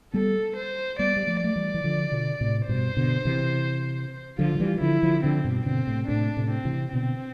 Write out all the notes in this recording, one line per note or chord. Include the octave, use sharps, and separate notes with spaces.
G3 B3 A4
C5
G3 B3 D5
G3
F3 A3
A3 D5
E3 G3
E3
D3 F3
B2 D3
A2 C3
G2 B2 C5
B2 D3
C3 E3
D3 F3 F4
F3
E3 G3
D3 F3 E4
D3 F3
D3 F3 C4
G2 B2
B2 D3 C4
A2 C3
A2 C3 D4
A2 C3
C4
C3 E3
B2 D3 C4